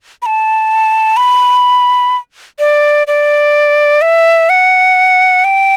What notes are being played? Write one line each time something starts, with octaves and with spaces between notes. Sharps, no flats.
B5
A5
B5
D5
D5
E5
F#5
G5